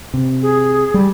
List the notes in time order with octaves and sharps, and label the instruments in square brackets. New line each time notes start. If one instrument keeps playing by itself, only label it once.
[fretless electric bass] C3
[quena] G#4
[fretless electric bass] G3